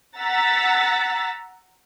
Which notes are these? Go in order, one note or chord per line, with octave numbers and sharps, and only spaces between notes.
F#5 A#5 E6 A6 B6